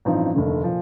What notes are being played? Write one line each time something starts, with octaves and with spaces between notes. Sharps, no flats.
A1 G2 F3 C4 D#4
F1 D#2 D3 A3
A#2 F3